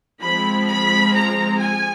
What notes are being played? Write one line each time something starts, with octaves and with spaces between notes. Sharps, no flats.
F3 G#3 C4 B5
B5
A#5
G#5